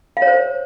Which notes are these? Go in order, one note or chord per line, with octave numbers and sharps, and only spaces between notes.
F5
C#5
C5